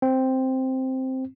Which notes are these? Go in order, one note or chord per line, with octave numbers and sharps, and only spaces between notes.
C4